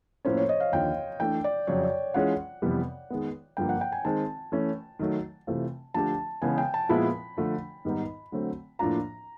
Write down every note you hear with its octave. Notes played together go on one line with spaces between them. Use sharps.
A2 F3 A#3 C#4 C5
C#5
D#5
F5
D#2 D3 F3 G5
E3 A3 D4 G5
D5
F2 C#3 F#3 C#5
D5
E3 G#3 C#4 F4 F#5
F2 C3 E3 G3 B3
D#3 G#3 B3
G2 D3 F3 A#3 G5
F#5
G5
G#5
D#3 G#3 C4 A5
E3 A3 C#4
D#3 F#3 A3
C3 E3 A3 C4 F4
D3 F3 A3 D4 G4 A5
C#3 E3 G#3 B3 G#5
G5
A5
A#2 F3 G#3 B3 E4 B5
D3 F3 A3 D4
G#2 D#3 G3 B3 D#4
D3 F#3 A3 C4
A2 F3 A#3 D4 F4 A#5